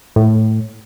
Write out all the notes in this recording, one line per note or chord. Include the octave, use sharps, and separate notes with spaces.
A2